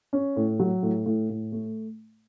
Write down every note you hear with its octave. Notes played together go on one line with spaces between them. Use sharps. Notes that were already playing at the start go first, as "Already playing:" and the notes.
C#4
A2
F#3
A2
A2
A2
A3